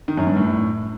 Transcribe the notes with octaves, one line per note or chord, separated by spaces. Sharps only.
D#3
F#2
G2
A2